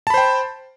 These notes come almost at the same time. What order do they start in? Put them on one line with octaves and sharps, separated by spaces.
A5 B5 C5 G5